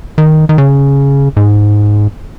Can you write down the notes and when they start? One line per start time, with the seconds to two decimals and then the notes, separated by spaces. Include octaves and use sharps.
0.18 D#3
0.49 D#3
0.58 C#3
1.37 G#2